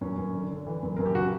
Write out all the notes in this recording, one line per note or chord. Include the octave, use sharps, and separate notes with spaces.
F#2 C#4
F#2
D3
D3
E3
F#2
F#2 A#4
G4
C#3 F#4